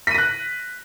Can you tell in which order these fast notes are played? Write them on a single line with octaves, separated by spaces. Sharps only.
B6 D#7 A#6 F#6